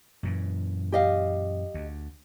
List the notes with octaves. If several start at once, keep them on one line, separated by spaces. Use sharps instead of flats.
F#2 A#2 E3
G4 D#5 F5
D2